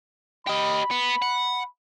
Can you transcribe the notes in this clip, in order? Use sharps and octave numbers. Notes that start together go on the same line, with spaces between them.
G4 D#5 B5
B3
F#5